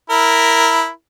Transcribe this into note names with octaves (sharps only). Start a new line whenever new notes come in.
E4 A#4